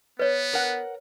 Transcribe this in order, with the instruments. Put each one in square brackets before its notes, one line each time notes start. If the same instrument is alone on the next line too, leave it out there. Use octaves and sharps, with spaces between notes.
[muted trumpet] B3 [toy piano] B4 C#5
[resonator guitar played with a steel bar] A#4 F#5